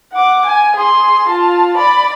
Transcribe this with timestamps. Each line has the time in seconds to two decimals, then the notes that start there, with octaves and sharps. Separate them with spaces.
0.13 F#5 D6
0.46 G#5
0.76 G#4 C6
1.28 F4 A5
1.77 D5 B5